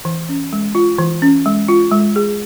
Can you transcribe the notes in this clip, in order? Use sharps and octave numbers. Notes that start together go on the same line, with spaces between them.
E3
C#4
G#3
F4
E3
C#4
G#3
F4
G#3
G#4